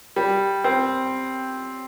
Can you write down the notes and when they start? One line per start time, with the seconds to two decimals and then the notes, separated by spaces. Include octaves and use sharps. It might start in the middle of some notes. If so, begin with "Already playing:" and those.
0.16 G3
0.64 C4